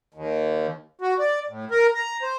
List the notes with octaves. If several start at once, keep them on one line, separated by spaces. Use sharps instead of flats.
D#2
F#4
D5
A2
A#4
A#5
C5